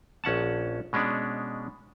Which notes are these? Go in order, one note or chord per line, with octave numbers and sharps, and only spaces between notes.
A#1 C#4 F#5 A5
B2 G#3 C#4 D4